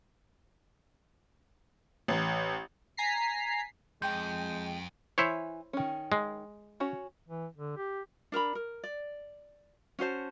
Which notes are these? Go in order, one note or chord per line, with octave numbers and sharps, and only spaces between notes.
A1
G#5 A#5 B6 C7
F2 G#3 G5 G6 D#7
E3 E4 C5 C#5 E5
D#3 C#4
G#3
C#4 F#4 C#5
E3
D3
G4
D4 A#4 A#5 B5
A#4
D5
C#4 F#4 C5 A5